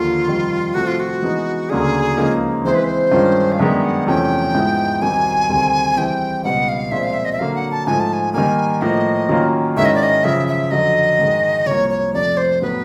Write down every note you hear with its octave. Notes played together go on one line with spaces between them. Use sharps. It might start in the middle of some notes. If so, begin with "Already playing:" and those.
Already playing: D#2 D3 F3 A#3 F4
F2 C3 D#3 G3
C3 F3 A3 C4 F#4
F4
F#4
E3 G#3 B3 D#4
D2 C#3 F#3 A#3 D4 G#4
C#2 C#3 F3 A#3 D#4
E3 G#3 C4 E4 C5
B4
C5
G2 D#3 G#3 C#4 F4
F5
F#2 D#3 G#3 B3 D4 E5
F#5
E2 C3 F3 A3 C#4 G5
G#2 F3 G#3 B3 E4
C2 C3 D#3 F#3 G#5
D2 C3 D#3 G3 C4
E3 G3 C4 E4 G#4 G5
C#2 B2 G3 B3 F#5
F5
A#2 F3 G#3 C4 E5
F5
E5
D#5
E5
D3 F#3 A#3 F5
F#5
A5
G#2 F3 A3 G#5
A5
G#5
D#3 G3 A#3 G#5
A2 F3 A#3 D#5
D#3 F#3 A#3 C#4 F4
G#2 D#3 G#3 C#4 E4 E5
D#5
D5
D#5
F#2 C#3 F3 E5
E5
F2 D3 F#3 D#5
G#2 D#3 G#3
C2 C3 F3 A#3 C#5
C#5
F2 C3 F3 A3 D5
C5
A2 F#3 B3 B4